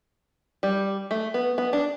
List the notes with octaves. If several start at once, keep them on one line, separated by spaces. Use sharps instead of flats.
G3
A3
B3
B3
D4